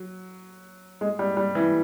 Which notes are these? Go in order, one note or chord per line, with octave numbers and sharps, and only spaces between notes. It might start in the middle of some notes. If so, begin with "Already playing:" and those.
Already playing: F#3
G#3
G3
G3
E3